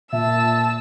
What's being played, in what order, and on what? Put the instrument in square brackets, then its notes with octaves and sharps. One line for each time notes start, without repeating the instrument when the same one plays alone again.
[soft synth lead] A#2 [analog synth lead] E5 [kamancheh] A5 E6